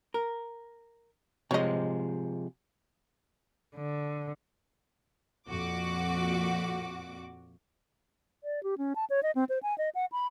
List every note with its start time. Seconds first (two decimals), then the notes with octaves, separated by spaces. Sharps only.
0.14 A#4
1.51 C3 F3 G#3 C#5 D#5
3.75 D3
5.49 F2 A#2 F#4 D6
8.44 D5
8.63 G4
8.78 C#4
8.96 A5
9.10 C#5
9.23 D#5
9.35 C4
9.49 C5
9.63 G#5
9.78 D#5
9.95 F#5
10.12 B5